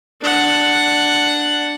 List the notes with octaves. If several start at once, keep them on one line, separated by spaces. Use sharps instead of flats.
D4 F#5